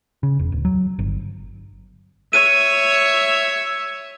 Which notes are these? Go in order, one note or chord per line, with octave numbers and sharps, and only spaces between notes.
C#3
E1
D1
F#3
G1
C#5 E5 D#7